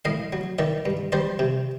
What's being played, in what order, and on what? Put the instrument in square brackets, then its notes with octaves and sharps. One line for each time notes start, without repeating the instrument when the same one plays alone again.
[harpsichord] A2 D#5 F5
F#3
D#3 D5 E5
G2
G3 C5 D5
C3